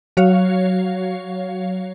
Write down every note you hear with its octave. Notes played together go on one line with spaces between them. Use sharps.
F#3 F#4 C#5 F5